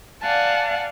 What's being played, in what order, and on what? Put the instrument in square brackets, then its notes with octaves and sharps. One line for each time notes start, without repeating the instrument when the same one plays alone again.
[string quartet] D5 F5 F#5 G#5 A5